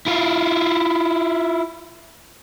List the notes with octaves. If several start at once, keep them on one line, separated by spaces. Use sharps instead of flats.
E4 F4